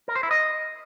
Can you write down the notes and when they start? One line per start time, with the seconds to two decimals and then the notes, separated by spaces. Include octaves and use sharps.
0.08 A#4
0.15 C5
0.23 E4
0.31 D#5